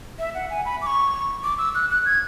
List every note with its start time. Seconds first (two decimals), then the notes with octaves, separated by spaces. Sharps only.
0.19 E5
0.35 F#5
0.50 G#5
0.65 B5
0.81 D6
0.86 C#6
1.44 D6
1.58 E6
1.75 F#6
1.90 F#6
2.05 G#6